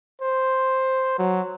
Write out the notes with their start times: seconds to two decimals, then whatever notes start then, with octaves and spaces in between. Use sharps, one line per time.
0.21 C5
1.19 F#3